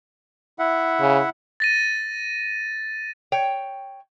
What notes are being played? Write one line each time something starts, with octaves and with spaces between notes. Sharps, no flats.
E4 E5 F#5
C#3
A6 A#6 D#7
C#5 G5